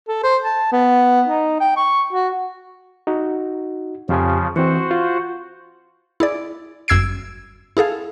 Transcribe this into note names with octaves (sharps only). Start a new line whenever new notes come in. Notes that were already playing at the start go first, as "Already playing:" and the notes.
A4
C5
A5
B3
D#4
G5
C#6
F#4
D#4 F#4
F2 C#3 F3 G4 G#5
E3 C4 F#4 C5 F#5
F4
E4 G#4 D5
G1 F#2 E6 G#6 C7 D7
E4 G#4 A4 F5